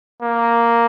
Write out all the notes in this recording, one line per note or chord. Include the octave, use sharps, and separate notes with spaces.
A#3